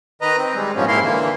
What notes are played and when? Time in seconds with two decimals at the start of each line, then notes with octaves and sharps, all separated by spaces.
0.22 D#3 B4 D#5 A#5
0.37 C4
0.55 G3 G#3
0.76 G2 A#2 F3 B3 C#4
0.88 G#2 A#3 E4 F5 C6
1.02 D3 E3 A#3